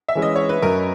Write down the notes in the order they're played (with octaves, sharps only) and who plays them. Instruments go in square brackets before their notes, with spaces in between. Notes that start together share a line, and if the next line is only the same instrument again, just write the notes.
[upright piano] E5
[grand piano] E3 G#3 C#4
[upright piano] D#5
C#5
B4
[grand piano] F#2 [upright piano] A#4